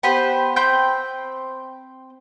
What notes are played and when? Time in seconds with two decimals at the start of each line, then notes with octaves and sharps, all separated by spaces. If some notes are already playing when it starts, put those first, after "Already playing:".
0.03 B3 G4 B4 C5
0.56 C4 G5 B5 G6